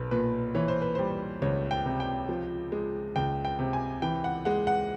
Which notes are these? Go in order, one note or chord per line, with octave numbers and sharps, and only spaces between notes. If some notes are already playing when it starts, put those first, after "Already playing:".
Already playing: B1 B4
A#2 B4
E3 C#5
C5
B4
G3 C5
C#2 C#5
G5
C3
G5
F3
G#3
C#2 G5
G5
C3
G#5
E3 G5
F#5
G#3 F#5
F#5